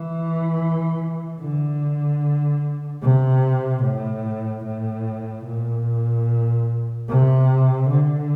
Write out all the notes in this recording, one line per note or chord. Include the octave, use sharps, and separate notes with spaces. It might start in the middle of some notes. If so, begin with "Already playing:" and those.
Already playing: E3
D3
C3
A2
A2
A#2
C3
D3